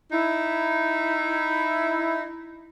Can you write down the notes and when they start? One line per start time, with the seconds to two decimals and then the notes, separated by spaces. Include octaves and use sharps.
0.12 D#4 E4